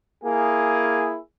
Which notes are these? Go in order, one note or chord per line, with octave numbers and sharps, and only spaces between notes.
A#3 E4 G#4